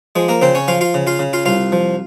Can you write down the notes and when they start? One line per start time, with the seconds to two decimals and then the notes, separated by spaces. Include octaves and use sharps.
0.15 F3 G#3 G#4
0.28 A#3 A#4
0.42 C#3 C4 C5
0.55 C#4 C#5
0.68 F3 F4 F5
0.81 F4 F5
0.94 C#3
1.07 F4 F5
1.19 C#3
1.33 F4 F5
1.45 C2 F4 F5
1.72 F3